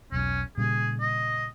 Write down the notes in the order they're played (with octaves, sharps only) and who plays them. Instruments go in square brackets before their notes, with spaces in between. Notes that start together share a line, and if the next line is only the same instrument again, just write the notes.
[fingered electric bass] E1 B1 [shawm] C#4
[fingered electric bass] A#2 C#3 G3 [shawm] G#4
[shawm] D#5